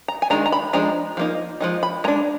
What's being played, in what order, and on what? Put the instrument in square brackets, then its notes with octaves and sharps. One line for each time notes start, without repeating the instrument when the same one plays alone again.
[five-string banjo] A#5
G#5
D#3 G#3 D4 A#5
A#5
B5
F3 G#3 D4 A#5
F3 A#3 D#4
F3 G#3 D#4
B5
G#3 A#5
D4